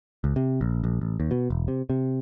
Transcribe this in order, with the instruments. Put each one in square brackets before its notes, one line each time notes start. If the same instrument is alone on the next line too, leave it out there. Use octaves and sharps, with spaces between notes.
[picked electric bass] C#2
C3
A#1
A#1
A1
D#2
B2
E1
C3
C3